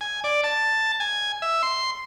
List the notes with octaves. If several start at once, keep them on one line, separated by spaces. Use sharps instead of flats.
G#5
D5
A5
G#5
E5
C6